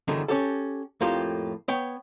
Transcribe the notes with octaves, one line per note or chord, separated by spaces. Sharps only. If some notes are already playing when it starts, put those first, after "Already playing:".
E2 G2 D3 D#3 F#3
C#4 G4 A4
F2 A2 A#3 F4 G4
B3 C#5 G5